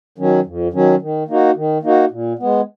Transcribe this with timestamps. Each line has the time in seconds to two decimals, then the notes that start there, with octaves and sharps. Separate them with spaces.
0.18 D#3 F#3 C#4
0.46 F2
0.73 D#3 F#3 C#4
1.01 D#3
1.28 A#3 D#4 F#4
1.56 D#3
1.83 A#3 D#4 F#4
2.11 A#2
2.39 G#3 B3